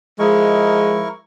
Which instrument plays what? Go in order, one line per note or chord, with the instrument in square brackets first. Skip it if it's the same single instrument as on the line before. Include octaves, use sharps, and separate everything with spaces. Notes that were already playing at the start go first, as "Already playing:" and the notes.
[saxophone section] F3 G#3 [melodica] E4 A#4 C#6